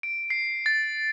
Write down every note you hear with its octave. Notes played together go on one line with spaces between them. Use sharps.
D7
C7
A6